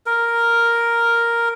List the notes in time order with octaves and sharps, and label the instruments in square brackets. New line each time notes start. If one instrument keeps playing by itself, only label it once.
[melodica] A#4